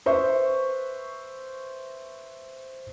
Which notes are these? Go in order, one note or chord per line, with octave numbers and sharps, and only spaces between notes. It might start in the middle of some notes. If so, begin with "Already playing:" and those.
B4 C5 E5 C#6